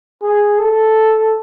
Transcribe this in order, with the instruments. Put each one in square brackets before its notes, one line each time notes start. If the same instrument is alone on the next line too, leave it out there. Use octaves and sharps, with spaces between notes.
[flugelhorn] G#4
A4